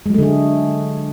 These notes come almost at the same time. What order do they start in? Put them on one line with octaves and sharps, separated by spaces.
G#3 F#3 A3 D3 G#4